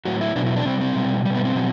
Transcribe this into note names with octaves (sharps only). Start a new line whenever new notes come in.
A2 F#3 F#4
E4
B2 F#3 D4
E4
D4
C3 G3 C4
C4
B2 G3
B2 G3
B3
C4
B2 F#3